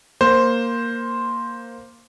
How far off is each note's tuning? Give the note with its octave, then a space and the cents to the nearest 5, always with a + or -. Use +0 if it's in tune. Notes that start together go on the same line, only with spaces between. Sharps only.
A#3 +0 C5 +0